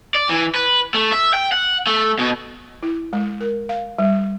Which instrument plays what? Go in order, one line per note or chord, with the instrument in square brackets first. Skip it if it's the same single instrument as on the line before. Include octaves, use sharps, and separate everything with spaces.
[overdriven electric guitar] D5
E3
B4
A3
E5
G5
F#5
A3
B2
[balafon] E4
G#3
A#4
F5
G3